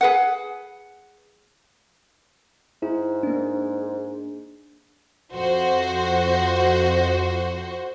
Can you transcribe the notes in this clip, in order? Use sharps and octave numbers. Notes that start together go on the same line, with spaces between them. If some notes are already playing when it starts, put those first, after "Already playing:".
G#4 B4 F#5
G#2 E4
A#3 D4
F2 F#4 C5